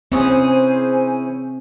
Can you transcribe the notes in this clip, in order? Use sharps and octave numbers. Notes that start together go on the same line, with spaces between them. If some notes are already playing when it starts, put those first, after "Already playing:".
E3 C4 C#4 G#4 C5 G#5